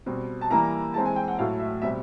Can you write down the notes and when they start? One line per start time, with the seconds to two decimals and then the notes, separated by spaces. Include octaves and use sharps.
0.06 B2 G3 C4
0.41 A5
0.50 E3 G3 A#3 A#5
0.94 E3 G#3 C4 A5
1.05 G#5
1.16 G5
1.28 F#5
1.39 A2 F#3 A3 F5
1.60 E5
1.82 B2 G3 C4 E5